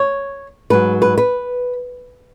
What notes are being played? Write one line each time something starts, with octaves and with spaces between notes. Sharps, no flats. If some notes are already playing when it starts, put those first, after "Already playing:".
Already playing: C#5
G#2 F#3 B4
B4
B4